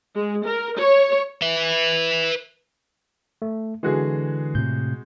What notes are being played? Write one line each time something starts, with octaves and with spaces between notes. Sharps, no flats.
G#3
A#4
C#5
B4 E5
A3
D3 E3 G#3 F#4 G#4
A2 C3 G6